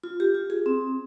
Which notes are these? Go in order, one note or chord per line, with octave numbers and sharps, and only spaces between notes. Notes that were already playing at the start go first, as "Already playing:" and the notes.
F4
G4
F4
G#4
C4